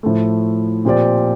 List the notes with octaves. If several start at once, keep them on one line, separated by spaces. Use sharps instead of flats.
A2 F3 A3
A#2 F3 C4 G4 D5